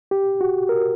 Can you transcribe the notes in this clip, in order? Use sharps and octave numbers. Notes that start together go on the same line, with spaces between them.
G4
F#4
A#4